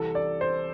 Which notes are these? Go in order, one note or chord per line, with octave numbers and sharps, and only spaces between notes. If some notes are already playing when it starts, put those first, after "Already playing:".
Already playing: C2 C3 E3 A4
D5
C5